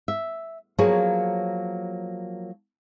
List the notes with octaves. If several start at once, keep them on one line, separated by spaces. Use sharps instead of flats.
E5
F3 F#3 A#3 B3 G#4 C#5